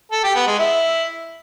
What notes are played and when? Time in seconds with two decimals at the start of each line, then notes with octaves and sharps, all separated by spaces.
0.12 A4
0.24 G4
0.35 B3
0.47 G#3
0.59 E4